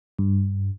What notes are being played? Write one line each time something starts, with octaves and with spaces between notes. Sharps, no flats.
G2